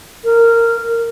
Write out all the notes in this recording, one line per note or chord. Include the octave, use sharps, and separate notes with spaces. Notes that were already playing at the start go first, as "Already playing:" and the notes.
A#4